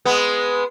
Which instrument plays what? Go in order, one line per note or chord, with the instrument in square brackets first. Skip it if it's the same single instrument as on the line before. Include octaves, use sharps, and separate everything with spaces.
[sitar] G#3 B3